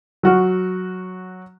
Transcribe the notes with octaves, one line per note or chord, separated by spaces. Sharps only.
F#3 F#4 F6